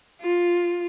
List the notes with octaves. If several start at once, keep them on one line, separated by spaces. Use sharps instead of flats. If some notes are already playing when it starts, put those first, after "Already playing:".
F4